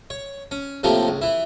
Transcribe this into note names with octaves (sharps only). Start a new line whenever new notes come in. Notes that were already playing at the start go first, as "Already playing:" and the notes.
C#5
C#4
A2 C3 F3 A3 A#3 G4
C#2
E3 E4